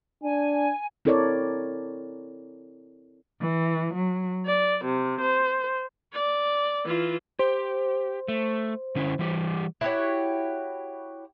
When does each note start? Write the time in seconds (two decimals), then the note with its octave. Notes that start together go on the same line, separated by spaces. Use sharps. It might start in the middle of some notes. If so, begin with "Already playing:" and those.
0.23 D4 G#5
1.05 C4 E4 A4 A#4 C#5 D5
3.42 E3
3.96 F#3
4.47 D5
4.86 C3
5.21 C5
6.13 D5
6.85 E3 F4
7.39 G4 C5
8.28 A3
8.95 D3 C#4 E4
9.19 E3 G3 G4
9.81 E4 F#4 G4 C#5